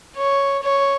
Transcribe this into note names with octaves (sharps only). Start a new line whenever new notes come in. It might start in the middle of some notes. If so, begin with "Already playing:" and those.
C#5
C#5